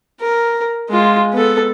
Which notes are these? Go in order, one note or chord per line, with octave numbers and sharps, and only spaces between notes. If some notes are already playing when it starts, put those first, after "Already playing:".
A#4
G#3 F4
B3 A4